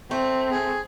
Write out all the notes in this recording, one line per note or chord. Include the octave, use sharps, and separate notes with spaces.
A3 C4
G#4